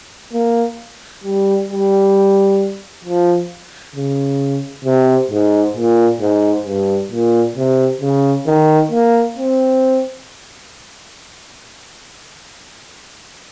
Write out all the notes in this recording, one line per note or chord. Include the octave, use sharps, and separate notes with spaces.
A#3
G3
G3
F3
C#3
C3
G#2
A#2
G#2
G2
A#2
C3
C#3
D#3
A#3
C4